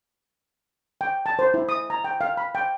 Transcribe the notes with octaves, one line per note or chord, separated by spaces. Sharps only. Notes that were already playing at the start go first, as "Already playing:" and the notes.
G5
A5
C5
E4
D#6
A#5
G5
F5
B5
G5